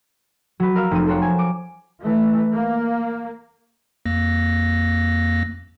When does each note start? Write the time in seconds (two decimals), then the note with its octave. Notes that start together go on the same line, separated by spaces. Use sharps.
0.60 F#3 B4
0.76 A#4 F5 E6 F6
0.91 F1 C4 D#7
1.07 A4 A#4 C5 C#5 F#5
1.22 G#5
1.39 D6
2.01 E3 A3
2.53 A#3
4.06 F2 A#3 A#6